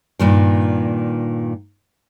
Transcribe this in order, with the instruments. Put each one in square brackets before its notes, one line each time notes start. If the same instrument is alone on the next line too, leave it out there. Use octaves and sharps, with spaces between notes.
[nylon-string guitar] G2 A#2 D#3